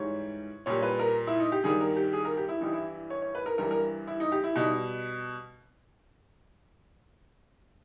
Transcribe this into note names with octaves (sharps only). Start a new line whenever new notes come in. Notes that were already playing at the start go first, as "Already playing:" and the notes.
Already playing: G#2 E3 G3 C#5
A#2 G3 C#5
B4
A#4
E4
D#4
G4
G2 D#3 G3 G#4
A#4
G4
G#4
A#4
G4
E4
G2 E3 G3 D#4
E4
C#5
C#5
B4
A#4
G2 E3 G3 A#4
A#4
E4
D#4
G4
E4
B2 G3 D#4